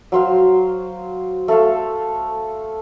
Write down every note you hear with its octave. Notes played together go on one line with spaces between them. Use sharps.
F#3 C5 F5
A3 A4 F5